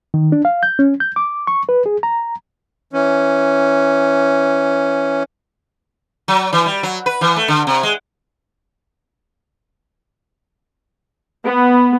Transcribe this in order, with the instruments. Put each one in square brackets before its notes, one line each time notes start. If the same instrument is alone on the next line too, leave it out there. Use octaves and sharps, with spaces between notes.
[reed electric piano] D#3
D4
F5
G6
C#4
G6
D6
C#6
B4
G#4
A#5
[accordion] E3 C#4
[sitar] F#3
E3
G3
F#3
B4
E3
A3
D3
C3
G#3
[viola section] B3